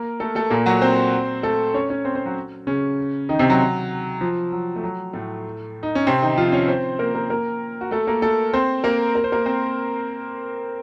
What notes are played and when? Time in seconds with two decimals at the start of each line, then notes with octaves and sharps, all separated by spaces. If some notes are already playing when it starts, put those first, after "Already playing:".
Already playing: A#3 A#4
0.20 A3 A4
0.35 A3 A4
0.50 A#2 A#3
0.66 F#3 F#4
0.81 C4 C5
1.43 A3 A4
1.74 C#4 C#5
1.89 C#4 C#5
2.05 C4 C5
2.15 C4 C5
2.26 F#3 F#4
2.67 C#3 C#4
3.29 D#3 D#4
3.39 C3 C4
3.50 F#3
4.21 F3
4.52 F#3
4.76 A3
4.84 F#3
5.13 A2 A3
5.83 D#4
5.95 C#4
6.07 C3 C4
6.22 D#3 D#4
6.37 F3 F4
6.52 C#4 C#5
6.68 C4 C5
6.99 A#3 A#4
7.14 A#3 A#4
7.30 A#3 A#4
7.81 F#4
7.91 A3 A4
8.07 A#3 A#4
8.22 A3 A4
8.53 C4 C5
8.84 A#3 A#4
9.15 A#4
9.24 C5
9.32 A#3 A#4
9.46 C4 C5